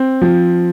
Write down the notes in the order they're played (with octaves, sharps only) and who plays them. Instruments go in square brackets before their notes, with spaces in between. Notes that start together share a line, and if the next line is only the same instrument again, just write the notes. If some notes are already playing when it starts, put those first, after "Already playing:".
Already playing: [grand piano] C4
F3